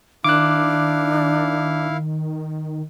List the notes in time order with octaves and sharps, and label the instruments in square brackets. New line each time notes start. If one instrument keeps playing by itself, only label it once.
[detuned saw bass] D#3 [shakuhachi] D4 [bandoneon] E4 F5 [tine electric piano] D6 F#6